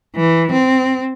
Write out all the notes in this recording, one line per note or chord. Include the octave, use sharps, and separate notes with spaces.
E3
C4